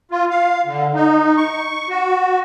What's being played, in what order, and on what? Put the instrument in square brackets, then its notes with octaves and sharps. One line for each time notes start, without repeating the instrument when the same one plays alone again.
[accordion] F4
F5
D3
D#4
C#6
F#4